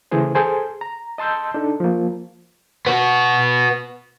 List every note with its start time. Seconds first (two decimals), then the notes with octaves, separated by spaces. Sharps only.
0.11 C#3 E3 A3 G#4 C5
0.35 G#4 A4 C5 G#5
0.81 A#5
1.18 D#5 A5 C6 E6 G6
1.54 D4 D#4 A4
1.80 F3 A#3
2.86 B3 F#4